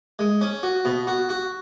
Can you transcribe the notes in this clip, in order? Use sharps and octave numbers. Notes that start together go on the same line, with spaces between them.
G#3
C#4
F#4
B2
F#4
F#4